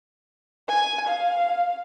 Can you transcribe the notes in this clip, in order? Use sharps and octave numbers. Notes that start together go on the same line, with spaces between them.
G#5
F5